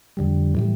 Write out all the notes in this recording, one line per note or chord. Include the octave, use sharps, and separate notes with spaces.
F2 D3 G3
A2 E3 G3